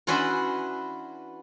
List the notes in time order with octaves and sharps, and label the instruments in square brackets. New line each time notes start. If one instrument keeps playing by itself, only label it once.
[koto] E3 C#4 D4 F#4 B4 C5